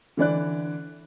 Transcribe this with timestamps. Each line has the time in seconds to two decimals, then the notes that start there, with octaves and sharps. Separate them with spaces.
0.17 D3 E3 D5 F#6